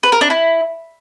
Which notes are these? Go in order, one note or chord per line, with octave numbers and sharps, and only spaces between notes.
B4
A#4
D4
E4